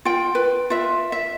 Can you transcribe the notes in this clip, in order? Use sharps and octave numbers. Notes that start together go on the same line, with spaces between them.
F4 G5
B4
F4 E5
E5